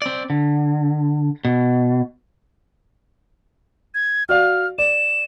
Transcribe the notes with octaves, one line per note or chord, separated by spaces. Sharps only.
C4 D5
D3
B2
G#6
F#4 D5 F5 F6
D5 E7